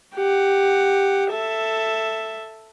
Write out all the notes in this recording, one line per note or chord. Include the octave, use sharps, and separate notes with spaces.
G4 F#5
A4 E5